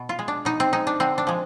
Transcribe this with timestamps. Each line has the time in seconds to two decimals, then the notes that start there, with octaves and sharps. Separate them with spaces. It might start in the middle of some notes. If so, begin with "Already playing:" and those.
Already playing: B2
0.09 F4
0.19 G#3
0.28 D4
0.45 B2 D#4
0.60 C4
0.73 G#3 D#4
0.87 D4
1.00 D3 C4
1.18 D4
1.27 F3 G#3